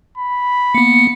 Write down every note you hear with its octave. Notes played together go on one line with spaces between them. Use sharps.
B5
A#3 B3 C#7